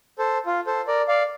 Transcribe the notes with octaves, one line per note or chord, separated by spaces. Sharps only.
A4 C5
F4
A4 C5
A#4 D5
D5 F5